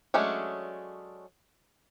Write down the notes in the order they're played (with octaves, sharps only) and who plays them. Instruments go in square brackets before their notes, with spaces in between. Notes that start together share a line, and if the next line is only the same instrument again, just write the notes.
[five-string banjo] F#3 G#3 A3 C#4 D4